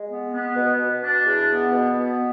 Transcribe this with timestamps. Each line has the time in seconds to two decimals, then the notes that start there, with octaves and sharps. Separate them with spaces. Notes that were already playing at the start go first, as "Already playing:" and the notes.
Already playing: G#3
0.10 B3
0.34 B3
0.56 B2
0.79 B2
1.03 D4
1.26 E2
1.49 B3
1.72 B2
1.95 B3